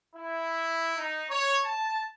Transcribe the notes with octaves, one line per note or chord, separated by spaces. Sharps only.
E4
D#4
C#5
A5